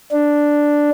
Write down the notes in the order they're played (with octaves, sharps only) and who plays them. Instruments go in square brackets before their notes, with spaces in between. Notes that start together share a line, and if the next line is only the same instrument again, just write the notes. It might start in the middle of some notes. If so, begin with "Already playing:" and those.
[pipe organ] D4